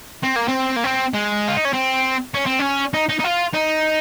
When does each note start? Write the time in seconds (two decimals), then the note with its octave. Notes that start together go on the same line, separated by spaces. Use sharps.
0.23 C4
0.36 A#3
0.48 C4
0.76 A#3
0.84 C4
1.14 G#3
1.48 F4
1.57 D#4
1.65 C#4
1.73 C4
2.34 C#4
2.46 C4
2.59 C#4
2.94 D#4
3.09 D#4
3.20 D#4
3.24 F4
3.54 D#4